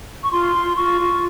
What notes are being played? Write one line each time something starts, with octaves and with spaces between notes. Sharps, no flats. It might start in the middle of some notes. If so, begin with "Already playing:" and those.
C#6
F4 C6
F4
F4 C#6
F4